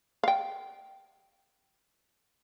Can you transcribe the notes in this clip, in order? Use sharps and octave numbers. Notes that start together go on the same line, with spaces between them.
F5 G5